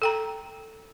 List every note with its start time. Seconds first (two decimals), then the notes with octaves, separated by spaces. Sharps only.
0.02 A4 G5 A#5